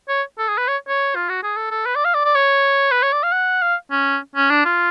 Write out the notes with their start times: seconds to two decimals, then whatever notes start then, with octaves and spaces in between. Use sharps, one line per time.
0.09 C#5
0.39 A4
0.48 G#4
0.58 B4
0.68 C#5
0.88 C#5
1.15 F4
1.29 F#4
1.43 G#4
1.56 A4
1.71 A4
1.86 B4
1.95 D5
2.05 F5
2.14 D5
2.25 D5
2.35 C#5
2.91 B4
3.02 C#5
3.13 D5
3.23 F5
3.32 F#5
3.62 F5
3.91 C#4
4.35 C#4
4.50 D4
4.65 F4